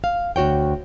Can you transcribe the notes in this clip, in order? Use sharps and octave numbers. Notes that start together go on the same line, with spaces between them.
F5
D2 F#4 C#5 G5